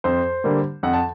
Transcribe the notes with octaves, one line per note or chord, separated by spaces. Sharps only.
F2 C5
D3 G3 A#3
F2 F#5
A5